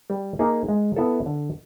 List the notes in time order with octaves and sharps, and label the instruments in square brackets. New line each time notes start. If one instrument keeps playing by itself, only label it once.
[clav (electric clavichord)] G3
A#3 D#4 G#4
G#3
B3 E4 A4
D3